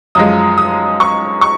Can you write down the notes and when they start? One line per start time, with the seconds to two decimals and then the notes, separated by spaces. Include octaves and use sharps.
0.15 F#2 F3 G#3 D#6
0.58 D#6
1.00 C#6
1.41 C#6